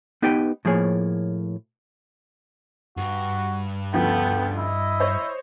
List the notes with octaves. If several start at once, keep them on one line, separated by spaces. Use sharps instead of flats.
B3 D#4 G4 B4 G5
A2 F3 A#3 G#4 C#5
G2 F#4
D2 C#3 F3 B3 A4 G5
E4 D#5
C5 C#5